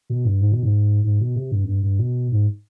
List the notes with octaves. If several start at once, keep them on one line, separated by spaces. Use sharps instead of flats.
B2
G2
G#2
B2
G#2
G#2
B2
C3
G2
F2
G2
G2
B2
G#2